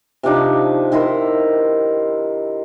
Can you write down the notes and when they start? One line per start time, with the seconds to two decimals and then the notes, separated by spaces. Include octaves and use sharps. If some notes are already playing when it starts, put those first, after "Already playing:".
0.23 C3 F3 D4 D#4
0.92 D#3 E4 A#4 C5